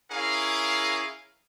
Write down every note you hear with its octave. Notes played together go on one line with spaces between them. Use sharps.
C#4 E4 G#4 A#4 F5